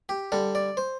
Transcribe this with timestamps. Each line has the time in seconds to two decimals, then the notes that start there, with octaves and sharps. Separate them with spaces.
0.09 G4
0.32 D3 G3 A4
0.55 D5
0.77 C5